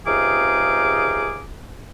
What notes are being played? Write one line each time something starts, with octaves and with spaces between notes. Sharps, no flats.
C#2 C3 D#4 G#4 F5 D6